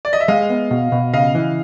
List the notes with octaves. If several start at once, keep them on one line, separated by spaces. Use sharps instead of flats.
D5
D#5
E5
G#3 D#5 F5
B3
B2
B2
C#3 D#5 F5
E3